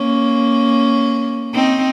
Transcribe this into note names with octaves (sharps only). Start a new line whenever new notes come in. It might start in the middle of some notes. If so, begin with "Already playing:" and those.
Already playing: A#3 C#4
C4 D#4